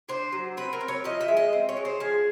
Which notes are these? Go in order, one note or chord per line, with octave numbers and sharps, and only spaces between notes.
D4 C5
F#3
C4 B4
A#4
C4
C#5
F3 D#5
E5
G#3
D#5
C4
C#5
G#3
C5
F3 G#4